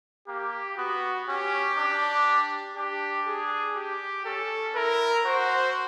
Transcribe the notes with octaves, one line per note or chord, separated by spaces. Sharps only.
A#3 G4
B3 F#4
C#4 G4
D4
D4 G4
G#4
G4
C#4 A4
E4 A#4
F#4 C5